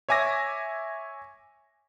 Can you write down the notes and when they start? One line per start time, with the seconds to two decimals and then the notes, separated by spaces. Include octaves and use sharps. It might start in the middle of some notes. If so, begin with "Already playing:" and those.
0.09 C#5 E5 G#5 D6 A#6